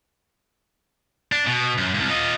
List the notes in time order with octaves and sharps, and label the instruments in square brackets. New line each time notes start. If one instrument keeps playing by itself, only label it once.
[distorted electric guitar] D4
B2
F#2
C2 G2
F4 D#5